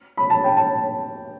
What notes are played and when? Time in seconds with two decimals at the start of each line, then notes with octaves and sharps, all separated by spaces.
0.17 B5
0.30 A5
0.44 G5
0.57 A5